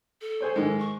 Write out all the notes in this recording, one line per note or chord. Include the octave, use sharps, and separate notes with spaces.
A4
G#4 C5 C#5
G#2 D#3 G#3
C#6